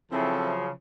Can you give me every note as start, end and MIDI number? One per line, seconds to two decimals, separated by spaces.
0.12 0.71 49
0.12 0.71 53
0.12 0.71 54
0.12 0.54 60
0.12 0.54 64
0.12 0.54 69